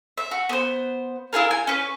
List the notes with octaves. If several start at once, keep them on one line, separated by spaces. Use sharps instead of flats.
E5
F#4
B3 C5
E4 F4 G#4 A#4
G#5
C#4 B4